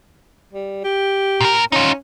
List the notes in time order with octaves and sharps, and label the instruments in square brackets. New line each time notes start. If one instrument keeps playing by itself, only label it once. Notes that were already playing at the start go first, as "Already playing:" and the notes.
[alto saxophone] G3
G4
[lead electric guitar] A#2 A#4
[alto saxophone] C#4 [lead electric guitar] D#4 F4